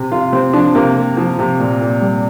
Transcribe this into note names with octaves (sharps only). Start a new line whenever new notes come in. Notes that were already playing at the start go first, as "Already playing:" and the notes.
Already playing: C3
C3 F4
C3 C4
F3 D4
C3 A#3
C3
F3
C3
A#2
A#2
G3